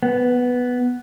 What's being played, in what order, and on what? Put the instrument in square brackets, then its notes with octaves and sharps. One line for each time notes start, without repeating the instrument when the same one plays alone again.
[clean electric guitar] B3